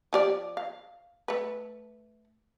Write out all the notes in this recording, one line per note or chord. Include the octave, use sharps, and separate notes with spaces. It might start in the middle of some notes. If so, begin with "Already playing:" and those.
F3 G4 D5
F5
A3 B4